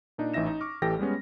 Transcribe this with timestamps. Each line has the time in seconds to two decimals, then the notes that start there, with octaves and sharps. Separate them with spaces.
0.18 A#2 D4 D#4
0.34 A1 E3 D#4 E5 A#6 E7
0.46 D#4
0.61 C#6 D6 F6
0.82 A1 E3 G4 A4 G5 A#6
0.99 G3 G#3 B3 C#4